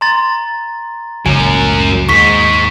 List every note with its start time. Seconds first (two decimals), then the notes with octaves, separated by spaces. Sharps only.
0.01 A#5 C6 A6
1.26 F#1 C#2 A2 F#3 C#4 G#5 D7
2.09 D#2 G#2 C#6 B6